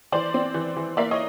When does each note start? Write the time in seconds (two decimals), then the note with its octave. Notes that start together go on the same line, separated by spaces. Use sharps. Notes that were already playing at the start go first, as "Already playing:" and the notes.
0.12 E3 C5 D5
0.34 C4
0.54 E3
0.77 E3
0.97 A#3 D5 E5
1.11 C#5 D#5